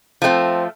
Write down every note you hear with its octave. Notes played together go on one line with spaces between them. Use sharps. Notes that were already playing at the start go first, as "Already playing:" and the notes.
F3 A3 C4